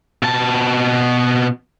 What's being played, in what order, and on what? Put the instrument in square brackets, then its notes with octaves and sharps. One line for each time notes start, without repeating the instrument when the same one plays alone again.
[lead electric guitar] B2 A5